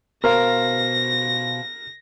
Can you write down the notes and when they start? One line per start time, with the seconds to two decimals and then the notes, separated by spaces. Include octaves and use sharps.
0.24 B2 A#4 C5 F5 A#6